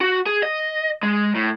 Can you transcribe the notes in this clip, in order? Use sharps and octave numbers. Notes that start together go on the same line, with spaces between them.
F#4
G#4
D#5
G#3
A2